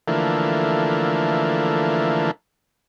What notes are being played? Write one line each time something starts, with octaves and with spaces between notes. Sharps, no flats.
D3 E3 F3 A3 A#3